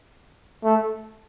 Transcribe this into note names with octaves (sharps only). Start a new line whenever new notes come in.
A3